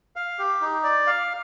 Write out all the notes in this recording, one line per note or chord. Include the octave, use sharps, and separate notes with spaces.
F5
G4
D#4
D5
F5